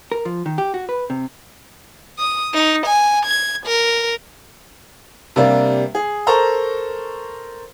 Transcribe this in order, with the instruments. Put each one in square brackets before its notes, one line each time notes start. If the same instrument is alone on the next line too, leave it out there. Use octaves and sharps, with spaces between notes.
[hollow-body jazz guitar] A#4
F3
D#3
G4
F#4
B4
C3
[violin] D#6
D#4
G#5
G#6
A#4
[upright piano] C3 G3 A#3 D4
G#4
A4 A#4 C5 A#5 C#6